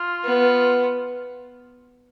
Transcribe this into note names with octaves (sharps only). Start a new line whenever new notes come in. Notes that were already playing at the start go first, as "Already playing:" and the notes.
Already playing: F4
B3